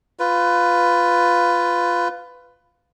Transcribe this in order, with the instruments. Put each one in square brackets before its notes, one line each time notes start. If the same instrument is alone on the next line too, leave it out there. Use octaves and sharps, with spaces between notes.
[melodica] F4 B4